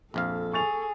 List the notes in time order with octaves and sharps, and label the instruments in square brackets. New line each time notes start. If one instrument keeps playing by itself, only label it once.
[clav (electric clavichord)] A#1 F2 F5 [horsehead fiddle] A4
[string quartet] G#4 [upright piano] C#6 A6 F7